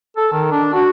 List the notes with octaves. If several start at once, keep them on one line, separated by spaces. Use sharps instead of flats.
A4
D#3
D4
F#4